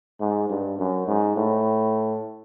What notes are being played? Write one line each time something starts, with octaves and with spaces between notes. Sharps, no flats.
G#2
G2
F#2
G#2
A2